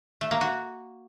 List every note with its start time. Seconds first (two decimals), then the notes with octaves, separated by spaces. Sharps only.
0.21 A3
0.31 A#3
0.41 F#4